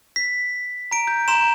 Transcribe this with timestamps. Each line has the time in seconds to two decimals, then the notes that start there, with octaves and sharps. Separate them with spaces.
0.16 B6
0.91 A#5 D7
1.07 G6
1.28 A#5 C6 E7